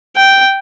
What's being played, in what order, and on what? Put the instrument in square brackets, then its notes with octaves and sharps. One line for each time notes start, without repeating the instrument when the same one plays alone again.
[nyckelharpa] G5